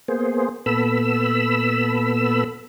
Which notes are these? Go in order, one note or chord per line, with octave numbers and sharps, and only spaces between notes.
A#3 B3 G#4 C5
A#2 B3 A4 B5 E6